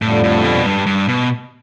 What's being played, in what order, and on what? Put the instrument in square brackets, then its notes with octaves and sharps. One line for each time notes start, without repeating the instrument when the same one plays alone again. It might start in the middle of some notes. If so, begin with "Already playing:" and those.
[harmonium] F2 D3 G3 [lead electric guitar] A2
[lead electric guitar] A2
B2
G2
G2
B2